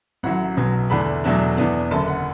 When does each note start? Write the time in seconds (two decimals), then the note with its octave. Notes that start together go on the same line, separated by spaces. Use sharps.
0.23 A1 A2 F#3 F#5
0.56 B1 B2 F#3 B3
0.90 E2 D3 A3 D4 B5
1.24 E2 B2 F#3 A3 D4
1.57 E2 E3 B3 D4
1.91 F#1 F#2 D3 A5
2.08 F#5